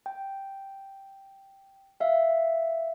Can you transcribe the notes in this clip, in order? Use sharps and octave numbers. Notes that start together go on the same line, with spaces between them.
G5
E5 F5